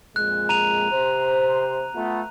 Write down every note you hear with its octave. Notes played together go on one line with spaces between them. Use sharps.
F2 A#2 G#3 F#6
A#5 D#7 F7
C3 C5
A3 B3 F4